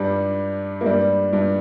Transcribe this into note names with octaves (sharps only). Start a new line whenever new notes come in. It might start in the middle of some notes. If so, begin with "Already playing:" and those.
Already playing: G2 G3
A#3
G2 G3
G2